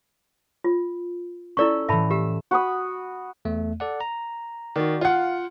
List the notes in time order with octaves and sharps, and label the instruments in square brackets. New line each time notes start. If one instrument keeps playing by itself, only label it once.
[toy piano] F4
[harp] C#4 A4 E6 [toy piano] E4 D5 C#6
[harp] A2 E3 [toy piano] E5 A5 B5
[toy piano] G4 [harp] E5
[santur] F#4 B5 D#6
[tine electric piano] E2 A3
A4 D5 F#5
A#5
[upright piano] D#3 [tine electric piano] F#4 D5
[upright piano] F4 F#5 [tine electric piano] F5